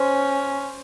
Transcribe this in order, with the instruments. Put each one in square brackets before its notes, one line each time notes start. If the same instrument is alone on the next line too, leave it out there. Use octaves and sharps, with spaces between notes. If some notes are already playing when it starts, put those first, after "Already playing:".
Already playing: [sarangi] C#4 [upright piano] C5